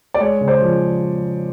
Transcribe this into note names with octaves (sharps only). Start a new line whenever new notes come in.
D5
G#3 C#5
C#3
C5 D5
F3